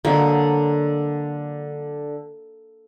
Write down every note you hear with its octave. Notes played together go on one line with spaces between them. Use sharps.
D3 F#3 G#3 A#3